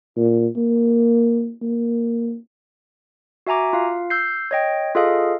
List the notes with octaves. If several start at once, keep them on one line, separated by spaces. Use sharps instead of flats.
A#2
A#3
A#3
F#4 E5 G#5 A#5 D6
F4 F5
E6 G6 C7
C#5 D#5 G5
F4 G#4 A4 D#5 F5